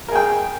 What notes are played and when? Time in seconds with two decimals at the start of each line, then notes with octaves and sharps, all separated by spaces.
0.08 A#4
0.12 G#4
0.15 G5